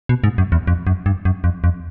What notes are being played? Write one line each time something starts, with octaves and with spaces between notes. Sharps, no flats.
B2
G#2
F#2
E2
F2
F#2
G2
F#2
F2
F2